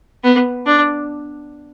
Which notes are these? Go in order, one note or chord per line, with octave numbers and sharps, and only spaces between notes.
B3
D4